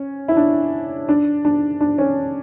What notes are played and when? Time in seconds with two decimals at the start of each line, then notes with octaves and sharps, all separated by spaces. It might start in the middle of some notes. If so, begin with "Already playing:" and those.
Already playing: C#4
0.28 E4
0.37 D4
1.09 D4
1.45 D4
1.81 D4
1.98 C#4